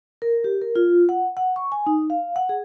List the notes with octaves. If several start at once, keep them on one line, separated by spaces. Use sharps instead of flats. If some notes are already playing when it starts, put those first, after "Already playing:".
A#4
G4
A#4
F4
F#5
F#5
C#6
G#5
D#4
F5
F#5
G#4